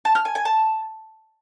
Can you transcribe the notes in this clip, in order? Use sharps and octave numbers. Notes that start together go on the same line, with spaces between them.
A5
F6
G#5
G#5
A5